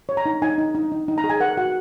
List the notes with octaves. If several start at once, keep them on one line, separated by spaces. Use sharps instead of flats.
C#5
A#5
D#4
D#4 G#5
D#4
D#4
D#4
D#4
A#5
G#4
G#5
A#4 F#5
F#4 F#5